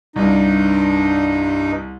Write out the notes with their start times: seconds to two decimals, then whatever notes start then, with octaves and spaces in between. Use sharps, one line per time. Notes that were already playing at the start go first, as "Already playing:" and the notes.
0.16 C2 G2 D#4